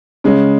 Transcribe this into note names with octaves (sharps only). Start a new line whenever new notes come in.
C#3 G#3 C#4